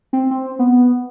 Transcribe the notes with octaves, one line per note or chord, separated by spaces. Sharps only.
C4
C4
B3